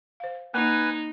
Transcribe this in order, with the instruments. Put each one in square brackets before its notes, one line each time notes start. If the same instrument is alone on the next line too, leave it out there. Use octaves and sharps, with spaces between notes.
[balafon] C5 F5
[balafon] A#3 [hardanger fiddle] D#4 [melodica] B4 G#5